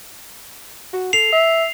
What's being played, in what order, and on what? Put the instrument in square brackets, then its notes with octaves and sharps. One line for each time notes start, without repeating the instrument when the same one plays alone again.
[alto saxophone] F#4
[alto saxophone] A4 [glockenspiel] C7 F7
[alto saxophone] E5